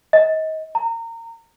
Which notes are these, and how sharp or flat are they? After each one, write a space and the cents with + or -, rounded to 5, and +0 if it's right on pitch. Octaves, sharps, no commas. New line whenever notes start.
D#5 +30
A#5 -25